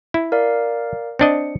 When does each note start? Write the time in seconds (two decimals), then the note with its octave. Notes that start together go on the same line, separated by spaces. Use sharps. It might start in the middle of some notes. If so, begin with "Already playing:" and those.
0.14 E4
0.32 A#4 D5 F5
1.19 C4 D4 D#5 C#7